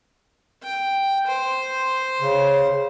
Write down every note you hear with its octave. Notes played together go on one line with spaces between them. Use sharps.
G5
C5
C#3